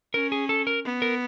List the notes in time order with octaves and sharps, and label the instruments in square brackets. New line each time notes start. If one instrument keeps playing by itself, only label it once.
[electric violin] C#4 [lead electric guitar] A#4
[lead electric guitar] G#4
A4
A#4
[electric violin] B3
[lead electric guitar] A#4